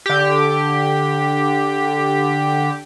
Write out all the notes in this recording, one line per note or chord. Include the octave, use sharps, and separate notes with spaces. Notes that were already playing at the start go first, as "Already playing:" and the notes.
D3 G4